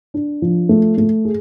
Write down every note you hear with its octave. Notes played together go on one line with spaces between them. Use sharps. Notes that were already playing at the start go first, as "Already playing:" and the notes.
D4
F3
A3
A3
G#4